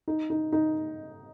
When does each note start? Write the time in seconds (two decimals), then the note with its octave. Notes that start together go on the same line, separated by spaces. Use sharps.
0.08 D#4
0.30 D#4
0.52 D#4